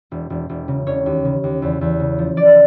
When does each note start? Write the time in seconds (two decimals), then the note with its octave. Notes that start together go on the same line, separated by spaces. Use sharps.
0.11 E1
0.30 E1
0.49 E1
0.68 C#3
0.86 E1 C#5
1.06 D#2
1.25 C#3
1.44 D#2
1.62 E2
1.81 E2
2.00 C#3
2.19 F3
2.37 F3 D5